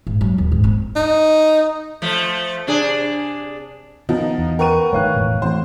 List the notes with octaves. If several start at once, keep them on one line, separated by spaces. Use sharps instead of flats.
G#2
F#3
D#2
G#2
C4
D#4
F3 A3
C3 D4 G#4
D#3 F3 B3 D#4
E2
A#4 B4 F#5 G5 C#6 D#7
D#3 F3 A3 C#5 F5 F#6
E1 A2
E3 A3 C4 C5